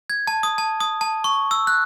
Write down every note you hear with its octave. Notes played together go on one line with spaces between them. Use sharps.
G#6
A5
D#6
A5
D#6
A5
C#6
E6
F#6